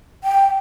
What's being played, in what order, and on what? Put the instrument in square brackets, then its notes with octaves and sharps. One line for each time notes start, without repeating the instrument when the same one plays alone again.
[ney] G5